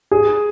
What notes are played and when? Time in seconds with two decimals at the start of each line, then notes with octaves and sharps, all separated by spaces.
0.11 G#4